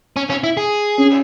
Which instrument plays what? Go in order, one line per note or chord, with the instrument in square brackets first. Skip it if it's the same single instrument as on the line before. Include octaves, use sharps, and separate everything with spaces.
[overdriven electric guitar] C#4
C#4
E4
G#4
[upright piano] C#4